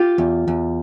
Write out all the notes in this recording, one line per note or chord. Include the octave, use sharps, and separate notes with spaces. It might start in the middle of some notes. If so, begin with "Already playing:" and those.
Already playing: F4 G4
E2
E2